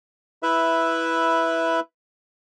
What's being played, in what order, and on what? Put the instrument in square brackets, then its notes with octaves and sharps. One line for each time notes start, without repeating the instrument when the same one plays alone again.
[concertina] E4 B4 E5